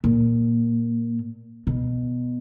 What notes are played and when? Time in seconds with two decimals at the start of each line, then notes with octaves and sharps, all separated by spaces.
0.04 A#2
1.67 B2